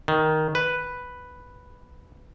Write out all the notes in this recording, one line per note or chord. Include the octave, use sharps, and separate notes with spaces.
D#3
B4